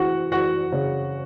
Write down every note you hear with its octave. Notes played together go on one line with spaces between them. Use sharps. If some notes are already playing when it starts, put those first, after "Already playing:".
Already playing: E3 F#4 F#5
E3 F#4 F#5
C#3